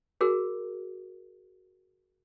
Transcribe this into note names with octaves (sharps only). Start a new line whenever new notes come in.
F#4 G#4 A#4